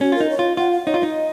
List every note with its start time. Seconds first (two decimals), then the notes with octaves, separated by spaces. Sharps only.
0.01 C#4 F#4
0.12 F4 A#4
0.20 D#4
0.30 C#5
0.39 F4
0.57 F4 F#5
0.72 F5
0.86 D#4 C#5
0.94 F4
1.01 D#4 D#5